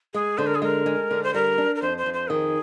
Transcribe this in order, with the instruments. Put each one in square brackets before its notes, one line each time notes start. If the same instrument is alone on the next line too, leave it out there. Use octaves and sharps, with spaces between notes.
[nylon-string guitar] G#3 [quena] G#4
[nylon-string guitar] D3 [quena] C5
[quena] A#4
G#4
[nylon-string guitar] G#3 [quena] A#4
[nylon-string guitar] G#3
D3
[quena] C5
[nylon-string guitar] G3 [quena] A#4
[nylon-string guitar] D4
[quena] A#4
[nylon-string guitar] F2 [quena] C5
[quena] C5
[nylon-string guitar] F2
[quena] C5
[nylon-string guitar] D#3 [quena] G#4